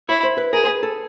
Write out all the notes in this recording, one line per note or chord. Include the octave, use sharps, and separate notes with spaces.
E4 C#5
C5
B4
G#4 A#4
C5
B4
A4